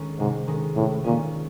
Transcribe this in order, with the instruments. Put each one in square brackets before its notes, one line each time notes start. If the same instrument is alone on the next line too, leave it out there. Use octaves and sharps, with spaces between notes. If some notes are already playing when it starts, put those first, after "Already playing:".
Already playing: [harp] D#3 G#3 C#4
[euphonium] G#2 [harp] C3
[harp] D#3 G#3 C#4
[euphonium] A2 [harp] C3
[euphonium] A#2 [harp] D#3 G#3 C#4